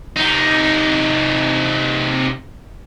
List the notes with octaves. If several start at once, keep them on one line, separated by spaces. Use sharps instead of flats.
C3 D#4